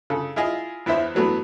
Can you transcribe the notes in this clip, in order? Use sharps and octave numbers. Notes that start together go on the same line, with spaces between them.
C#3 A4
E4 F4 G#4 D#5
E2 E3 B3 E4 C5 E5
E3 F#3 A3 B3